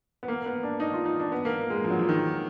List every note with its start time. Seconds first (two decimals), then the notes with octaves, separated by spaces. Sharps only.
0.23 B3
0.28 A#3
0.46 B3
0.63 D4
0.80 D#4
0.94 F4
1.06 D#4
1.20 D4
1.32 B3
1.45 A#3
1.70 G#3
1.84 F3
1.91 F#3
1.99 F3
2.09 D#3